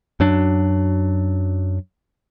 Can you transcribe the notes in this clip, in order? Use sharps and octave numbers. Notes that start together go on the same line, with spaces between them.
F#2 F#3 D4